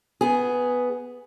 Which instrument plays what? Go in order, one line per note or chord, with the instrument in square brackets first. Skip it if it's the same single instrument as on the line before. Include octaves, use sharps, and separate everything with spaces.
[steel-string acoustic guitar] B3 G#4